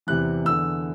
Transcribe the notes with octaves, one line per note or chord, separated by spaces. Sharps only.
E2 C3 E3 F#6
E2 D3 E6